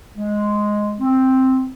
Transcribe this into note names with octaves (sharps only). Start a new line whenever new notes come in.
G#3
C4